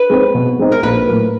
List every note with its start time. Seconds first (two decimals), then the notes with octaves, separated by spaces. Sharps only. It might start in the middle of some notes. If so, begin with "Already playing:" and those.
Already playing: B4
0.10 G#3 C4 D#4
0.35 B2
0.59 G#3 C4 D#4
0.72 A#4
0.83 A#1 B4
1.08 A2 F#3 A#3